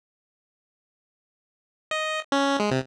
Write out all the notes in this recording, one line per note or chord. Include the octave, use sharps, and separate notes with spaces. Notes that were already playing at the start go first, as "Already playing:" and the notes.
D#5
C#4
G#3
C3